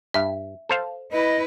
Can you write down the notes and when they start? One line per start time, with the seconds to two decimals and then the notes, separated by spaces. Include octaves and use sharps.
0.14 G2 E5
0.69 A4 C5 F5
1.12 E4 B4 D#5